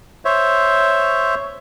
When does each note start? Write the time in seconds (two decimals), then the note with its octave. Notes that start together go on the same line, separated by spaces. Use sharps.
0.25 C5 C#5 E5